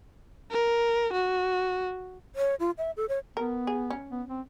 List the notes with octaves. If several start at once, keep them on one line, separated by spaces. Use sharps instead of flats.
A#4
F#4
C#5
F4
E5
A4
C#5
B3 A#4
G#4
C#4
B3
C4